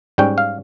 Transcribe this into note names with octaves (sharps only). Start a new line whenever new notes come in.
G#2 G3 C#4 G5
F5